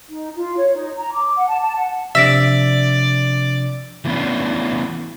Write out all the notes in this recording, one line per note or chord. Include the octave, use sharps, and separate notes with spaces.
D#4
F4
C#5
D#4
A#5
D6
F#5
A5
A5
F#5
C3 F3 D4 D5 E5 E6 A#6 D7
E3 A3 B3 C#4 D4